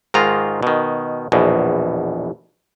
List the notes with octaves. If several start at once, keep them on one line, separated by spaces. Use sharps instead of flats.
G#2 D#3 G#3 F4 A#5
B2 D#3
A#1 E2 B2